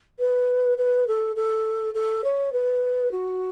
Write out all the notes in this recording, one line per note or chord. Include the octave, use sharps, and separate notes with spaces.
B4
B4
A4
A4
A4
C#5
B4
F#4